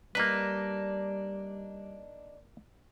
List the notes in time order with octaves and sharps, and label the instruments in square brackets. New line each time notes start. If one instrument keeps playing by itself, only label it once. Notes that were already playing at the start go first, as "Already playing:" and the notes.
[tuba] G3 [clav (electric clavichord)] A#3 B4 [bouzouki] D4 D#4